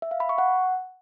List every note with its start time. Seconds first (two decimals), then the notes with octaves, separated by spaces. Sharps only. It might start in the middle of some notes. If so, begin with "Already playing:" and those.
0.02 E5
0.11 F5
0.20 B5
0.29 C#6
0.38 F#5